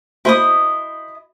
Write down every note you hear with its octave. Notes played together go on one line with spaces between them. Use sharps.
E4 F#4 C5 D#5 B5 D#6